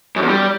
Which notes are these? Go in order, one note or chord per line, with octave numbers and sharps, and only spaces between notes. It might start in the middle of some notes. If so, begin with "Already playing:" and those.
F#2
E2
G3